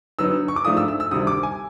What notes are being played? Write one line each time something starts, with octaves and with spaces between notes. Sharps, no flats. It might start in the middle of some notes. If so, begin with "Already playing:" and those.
D3 F#3 B3 D#4 E6
C#6
D6
G#2 F3 A3 D4 F4 D#6
E6
E6
E6
D2 C3 D#3 G3 D#6
D6
G#5